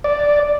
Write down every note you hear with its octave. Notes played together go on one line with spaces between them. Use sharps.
D5